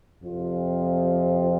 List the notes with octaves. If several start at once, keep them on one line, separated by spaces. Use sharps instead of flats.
F2 C3 F3 C4 F4